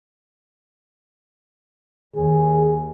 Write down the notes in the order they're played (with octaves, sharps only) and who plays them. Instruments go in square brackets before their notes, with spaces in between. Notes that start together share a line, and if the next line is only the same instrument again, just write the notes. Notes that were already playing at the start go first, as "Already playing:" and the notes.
[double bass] D#2 D#3 [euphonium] G#4